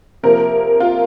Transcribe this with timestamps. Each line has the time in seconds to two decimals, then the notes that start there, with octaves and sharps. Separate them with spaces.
0.23 C3 F3 A#3 A#4
0.80 F4